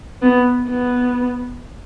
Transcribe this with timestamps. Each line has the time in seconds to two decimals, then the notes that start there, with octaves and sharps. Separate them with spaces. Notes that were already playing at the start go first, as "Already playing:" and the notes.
0.22 B3
0.68 B3